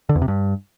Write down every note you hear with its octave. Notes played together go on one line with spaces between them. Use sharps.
D3
E2
C3
G2